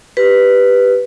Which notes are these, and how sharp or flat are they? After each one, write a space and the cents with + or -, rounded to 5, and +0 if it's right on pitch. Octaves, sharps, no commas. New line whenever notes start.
G4 +0 B4 +0